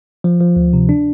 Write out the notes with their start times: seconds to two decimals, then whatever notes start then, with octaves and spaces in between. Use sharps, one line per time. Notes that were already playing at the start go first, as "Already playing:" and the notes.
0.24 F3
0.40 F3
0.56 D2
0.73 C3
0.89 D4